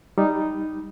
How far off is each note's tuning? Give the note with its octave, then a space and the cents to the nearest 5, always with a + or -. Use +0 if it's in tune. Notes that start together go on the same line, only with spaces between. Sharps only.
G3 +0 D#4 +0